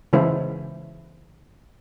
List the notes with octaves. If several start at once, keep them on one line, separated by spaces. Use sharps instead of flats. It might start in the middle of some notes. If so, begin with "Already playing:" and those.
C#3 E3 G#3 E4 B4 C5